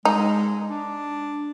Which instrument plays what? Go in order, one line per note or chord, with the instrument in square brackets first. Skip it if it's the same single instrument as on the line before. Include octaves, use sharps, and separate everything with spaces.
[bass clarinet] G#3 [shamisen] D#4
[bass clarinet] D4